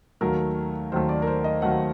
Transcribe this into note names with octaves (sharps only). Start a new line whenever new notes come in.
D#2 D#3 F#3 A3 A#4
D#2 D#3 F#3 A3 C5
D5
A#4
C5
D#5
D#2 D#3 F#3 A3 F#5